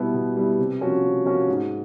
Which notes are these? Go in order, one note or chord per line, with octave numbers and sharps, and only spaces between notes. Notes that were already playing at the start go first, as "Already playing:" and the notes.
Already playing: B2 G3 B3 E4
B2
G3 B3 E4
C3
F3 A#3 C#4 F#4
C3
F3 A#3 C#4 F#4
G#2